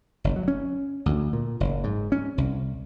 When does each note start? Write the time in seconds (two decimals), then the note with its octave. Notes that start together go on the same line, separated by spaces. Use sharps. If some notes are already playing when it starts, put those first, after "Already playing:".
0.24 F#1
0.36 F#3
0.48 C#4
1.06 D2
1.33 A#2
1.60 F#1
1.84 G#2
2.12 C#4
2.38 C2